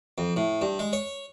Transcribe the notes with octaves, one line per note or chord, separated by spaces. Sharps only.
F2
A2
G2
G#3
C#5